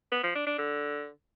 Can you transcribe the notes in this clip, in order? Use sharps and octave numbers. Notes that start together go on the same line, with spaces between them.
B3
F3
D4
D4
D3